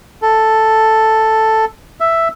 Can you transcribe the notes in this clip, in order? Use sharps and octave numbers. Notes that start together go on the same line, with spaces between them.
A4
E5